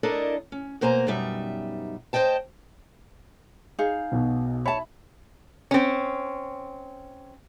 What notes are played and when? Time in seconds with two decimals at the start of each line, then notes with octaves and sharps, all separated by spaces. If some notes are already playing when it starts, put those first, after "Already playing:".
0.03 D4 E4 A4 A#4 D5 D#5
0.52 C#4
0.81 B2 A#3 C5 G#5 A#5
1.07 F#2 B2 G3 D#4 E5
2.13 C5 D5 D#5 G5 A5
3.79 D#4 G#4 F5
4.12 B1 B2
4.66 C#5 E5 A5 B5
5.71 C4 C#4